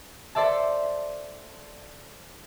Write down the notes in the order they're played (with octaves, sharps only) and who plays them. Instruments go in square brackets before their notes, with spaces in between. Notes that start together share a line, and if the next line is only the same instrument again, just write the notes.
[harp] A4 C5 D5 E5 A5